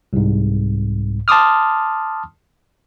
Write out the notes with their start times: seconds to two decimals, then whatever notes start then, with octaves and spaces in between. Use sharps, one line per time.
0.13 C2 G#2
1.28 A5 C6 D6 D#6 F6